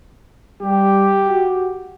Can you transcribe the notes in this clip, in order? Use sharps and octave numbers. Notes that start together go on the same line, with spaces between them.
G3 G4
F#4